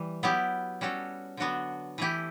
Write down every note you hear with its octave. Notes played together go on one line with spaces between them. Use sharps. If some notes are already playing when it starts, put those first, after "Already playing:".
Already playing: E3 G3
F#3 B3 E4 G4
G3 C#4 F#4 A4
D3 F#3 B3 D4 F#4
E3 A3 E4 G4